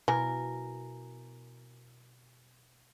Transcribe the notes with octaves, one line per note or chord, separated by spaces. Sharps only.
B2 E3 A#4 G#5